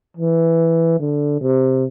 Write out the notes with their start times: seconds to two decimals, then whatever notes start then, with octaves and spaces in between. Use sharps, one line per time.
0.17 E3
1.00 D3
1.41 C3